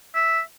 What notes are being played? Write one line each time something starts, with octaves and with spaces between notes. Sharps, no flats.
E5